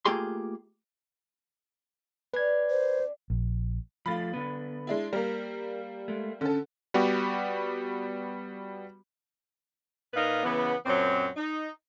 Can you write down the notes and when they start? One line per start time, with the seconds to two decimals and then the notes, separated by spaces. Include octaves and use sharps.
0.05 A3 A#3 F4 G4 G#4 C6
2.34 C#4 D4 B4 G#6
2.70 C5
3.30 A#1
4.06 F3 A3 F4 B5 A6
4.34 D3 B3
4.87 G#3 D4 E4
5.13 G3 A#3 G4 A#4
6.08 G#3 A3
6.41 D3 C#4 A4
6.94 G3 B3 F#4 G4
10.14 A#2 D#4 A#4 B4 F5
10.43 C#3 E3 B3
10.85 F#2 A#2 F#3 C4
11.36 D#4